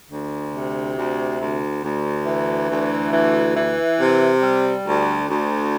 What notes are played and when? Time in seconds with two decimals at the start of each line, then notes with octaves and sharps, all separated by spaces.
0.10 D2
0.54 C3
0.96 D2
1.40 D2
1.84 D2
2.26 E3
2.70 D2
3.13 E3
3.56 E3
3.99 C3
4.42 G3
4.86 D2
5.29 D2